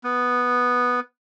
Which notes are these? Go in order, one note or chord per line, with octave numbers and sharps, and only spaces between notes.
B3